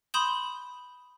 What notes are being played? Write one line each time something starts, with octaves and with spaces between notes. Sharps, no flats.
B5 C6 D#6 G6 E7 G7